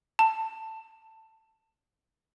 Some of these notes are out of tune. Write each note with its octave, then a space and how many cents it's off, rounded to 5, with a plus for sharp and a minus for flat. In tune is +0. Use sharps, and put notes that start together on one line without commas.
A5 +15